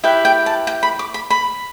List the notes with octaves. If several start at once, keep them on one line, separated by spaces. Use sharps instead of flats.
E4 G4 B4 G5
G5
A5
G5
B5
D6
B5
B5